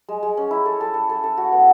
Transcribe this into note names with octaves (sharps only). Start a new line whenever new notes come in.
G#3
G#3
C#4
E4
A4
A4
A4
A4
A4
F#4
B3